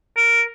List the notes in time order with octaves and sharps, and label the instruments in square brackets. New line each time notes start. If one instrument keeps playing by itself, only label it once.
[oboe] A#4